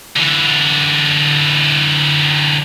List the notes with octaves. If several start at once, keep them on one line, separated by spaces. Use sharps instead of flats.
D3 E3